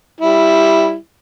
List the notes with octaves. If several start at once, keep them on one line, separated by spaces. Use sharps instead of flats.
G3 E4